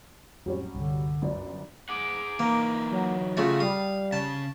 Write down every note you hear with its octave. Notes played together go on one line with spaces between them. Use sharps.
F2 A2 F#3 G3 C#4
C2 G2 D3
G1 F#2 D4
G#4 F#5 D6
E3 A#3 D#4
F#3
C#3 A3 F4 F#4
G3 F5 D#6
C#3 A5